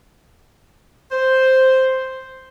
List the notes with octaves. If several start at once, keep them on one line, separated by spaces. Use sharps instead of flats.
C5